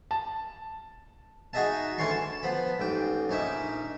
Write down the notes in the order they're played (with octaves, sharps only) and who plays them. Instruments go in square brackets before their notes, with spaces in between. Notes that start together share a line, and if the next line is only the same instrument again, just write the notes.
[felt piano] A5
[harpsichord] D#4 F#4 G#4 D#5 E5 A5
D2 E3 C#4 C#5 C6 C#6
A5
F3 B3 B5
A1 G#2 G5
A#1 C#4 D#4 E5